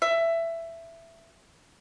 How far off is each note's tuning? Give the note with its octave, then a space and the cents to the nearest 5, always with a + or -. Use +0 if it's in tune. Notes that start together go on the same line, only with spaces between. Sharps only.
E5 +15